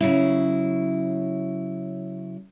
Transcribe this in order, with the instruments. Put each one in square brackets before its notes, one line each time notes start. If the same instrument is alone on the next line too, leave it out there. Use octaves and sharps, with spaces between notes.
[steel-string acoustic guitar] C#3 F#3 E4